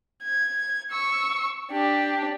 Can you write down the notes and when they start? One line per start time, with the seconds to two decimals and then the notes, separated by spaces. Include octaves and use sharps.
0.23 G#6
0.91 C#6 E6
1.71 D4 G4